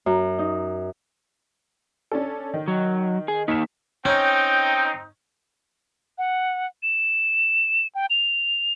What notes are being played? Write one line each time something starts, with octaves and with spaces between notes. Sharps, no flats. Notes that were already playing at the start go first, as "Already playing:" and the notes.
F#2
D#4
C#4 D4 A4
D#3
F#3
G#4
A#3 D#4 B6 E7
C4 C#4 D#4 G5
F#5
E7
G5
F7